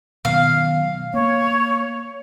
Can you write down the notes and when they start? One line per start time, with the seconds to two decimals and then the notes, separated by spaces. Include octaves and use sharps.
0.25 B2 D#3 F#3 F5
1.14 A#3 C#5